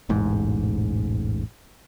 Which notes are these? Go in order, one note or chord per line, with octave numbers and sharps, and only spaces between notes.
E1 A1 G#2